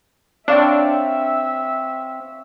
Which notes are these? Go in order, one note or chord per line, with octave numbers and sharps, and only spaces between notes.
C4 D4 C#5 E5 F5 G5